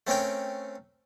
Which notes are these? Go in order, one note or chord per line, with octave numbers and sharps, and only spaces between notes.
A3 C4 C#4 A#4 G5